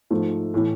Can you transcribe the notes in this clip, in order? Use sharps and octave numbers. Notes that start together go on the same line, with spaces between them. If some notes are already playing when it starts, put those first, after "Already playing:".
G#2 F3 A3
A2 E3 A3